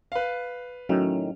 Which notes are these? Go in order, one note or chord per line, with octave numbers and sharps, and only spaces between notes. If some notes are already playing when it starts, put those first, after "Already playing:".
B4 F5
A2 D#3 F#3 C#4